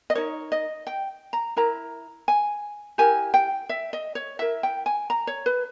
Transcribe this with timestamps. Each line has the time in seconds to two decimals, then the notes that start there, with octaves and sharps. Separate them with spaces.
0.10 D#5
0.15 D#4 A#4 C#5
0.52 D#5
0.87 G5
1.33 A#5
1.56 E4 A#4 A#5
2.28 G#5
2.98 E4 G4 A#4 G#5
3.34 G5
3.69 E5
3.93 D#5
4.15 C#5
4.39 E4 A#4 E5
4.63 G5
4.86 G#5
5.10 A#5
5.27 C#5
5.46 B4